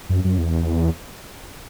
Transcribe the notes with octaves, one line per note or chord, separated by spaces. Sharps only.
F#2
F#2
E2